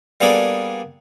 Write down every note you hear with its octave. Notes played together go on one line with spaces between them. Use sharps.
G3 A#3 B3 D4 G#4 A4